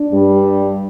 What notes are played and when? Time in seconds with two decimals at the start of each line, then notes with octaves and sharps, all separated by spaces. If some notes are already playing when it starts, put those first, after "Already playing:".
Already playing: D4
0.13 G2 G3